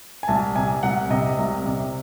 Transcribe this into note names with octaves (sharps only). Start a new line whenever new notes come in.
G#5
C2 A5
C3 G#5
C2 F#5
C3 D#5
C2
C3